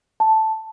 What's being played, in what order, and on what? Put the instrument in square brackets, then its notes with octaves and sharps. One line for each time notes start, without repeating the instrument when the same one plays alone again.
[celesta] A5